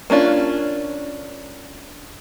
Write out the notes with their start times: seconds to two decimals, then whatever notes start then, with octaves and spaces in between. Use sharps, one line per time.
0.10 A#3 C#4 D4 F4